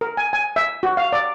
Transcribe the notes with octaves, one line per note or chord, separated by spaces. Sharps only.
A#4
G#5
G#5
E5
F#4
F5
D5